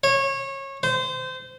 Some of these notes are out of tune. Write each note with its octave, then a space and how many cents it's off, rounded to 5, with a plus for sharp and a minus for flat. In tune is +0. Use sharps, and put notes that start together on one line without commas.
C#5 -25
C5 -25